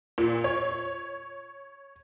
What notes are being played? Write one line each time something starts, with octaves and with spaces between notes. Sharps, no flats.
A#2
C#5